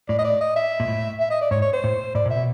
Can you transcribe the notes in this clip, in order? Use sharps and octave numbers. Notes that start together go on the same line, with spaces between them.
A2 D5
D#5
D5
D#5
E5
A#2
A2
E5
D#5
D5
G#2 C#5
C#5
C5
A2
A2 D5
A#2
E5
B2